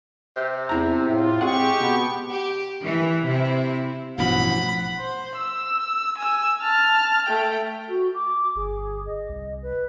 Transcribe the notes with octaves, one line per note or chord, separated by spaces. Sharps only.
C3
E2 C4 E4 A#5
A2 F4
G#3 C4 G4 G#4 F#5 C#6
B2 B3
G4
E3
C3 E4
A1 G2 B2 F3 F#5 B5
C5
E6
G#5 E6
A5 F6
A3 G5
F#4
D6
G1 G#4
D#5
C2
B4